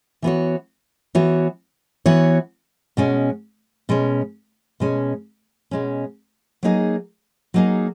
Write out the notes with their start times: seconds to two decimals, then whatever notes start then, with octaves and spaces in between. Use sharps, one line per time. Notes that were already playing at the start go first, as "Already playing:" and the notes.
0.22 E3 B3 F#4 C#5
1.15 E3 B3 F#4 C#5
2.06 E3 B3 F#4 C#5
2.97 B2 G#3 C#4
3.89 B2 G#3 C#4
4.80 B2 G#3 C#4
5.71 B2 G#3 C#4
6.63 F#3 A#3 D#4 G#4 D#5
7.54 F#3 A#3 D#4 G#4 D#5